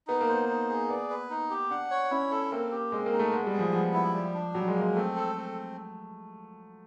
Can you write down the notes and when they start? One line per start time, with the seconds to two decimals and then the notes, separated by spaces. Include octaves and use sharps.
0.07 B3 D#4
0.21 A#3
0.28 B3 C5
0.49 D#4
0.69 G#4
0.89 B3 D5
1.10 B4
1.30 D#4
1.50 G4
1.70 D4 F#5
1.91 C#5
2.11 C#4 E4
2.31 A4
2.52 A#3 C4
2.72 G4
2.92 G#3 C4
3.06 A#3
3.12 D#4
3.19 A3
3.32 G#3 B3
3.47 G3
3.53 G#4
3.59 F3
3.73 F3 B3
3.94 E4
4.14 G3
4.34 D4
4.54 F#3 G3
4.68 G#3
4.75 A#3
4.82 G#3
4.96 A3 C4
5.16 A4
5.35 C4